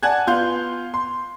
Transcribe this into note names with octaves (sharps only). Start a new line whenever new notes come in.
D5 F#5 G#5 A5 F#6 G#6
B3 F4 F5 C6 G6
C6